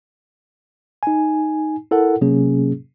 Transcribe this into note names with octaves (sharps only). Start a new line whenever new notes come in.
D#4 G#5
E4 A4 A#4 F#5
C3 F#3 A#3 C#4 G#4